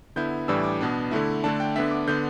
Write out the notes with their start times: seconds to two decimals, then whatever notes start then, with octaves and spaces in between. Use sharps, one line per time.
0.16 D3 B3 E4 G6
0.48 A2 E3 G3 D4 E6
0.63 D6
0.81 B2 B3 D4
1.11 D3 A3 E4
1.44 D3 A3 D4 A5
1.60 G5
1.76 D3 B3 D4 E5
1.91 D6
2.08 D3 B3 D4 G6